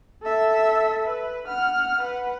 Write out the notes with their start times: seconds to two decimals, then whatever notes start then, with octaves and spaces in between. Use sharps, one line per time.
0.23 A4 E5
1.07 B4
1.47 F#5 F6
2.01 B4 F#5